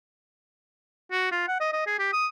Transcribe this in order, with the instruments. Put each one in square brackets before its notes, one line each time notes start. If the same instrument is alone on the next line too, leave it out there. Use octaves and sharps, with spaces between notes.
[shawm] F#4
F4
F#5
D#5
D#5
G#4
G4
D#6